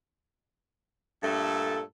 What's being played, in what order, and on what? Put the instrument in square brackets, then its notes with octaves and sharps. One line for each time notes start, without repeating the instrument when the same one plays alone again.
[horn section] G2 A#2 A3 A4